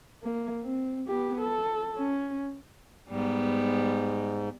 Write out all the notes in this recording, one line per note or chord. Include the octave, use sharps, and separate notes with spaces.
A#3
C4
B3 G4
A4
C#4
G#2 G3 B3